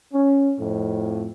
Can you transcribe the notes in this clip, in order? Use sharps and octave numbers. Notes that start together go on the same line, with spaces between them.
C#4
F2 A2